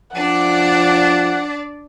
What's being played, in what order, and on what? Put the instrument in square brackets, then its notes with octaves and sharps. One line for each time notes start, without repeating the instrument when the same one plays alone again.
[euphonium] F3 [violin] D4 D5 [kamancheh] F#5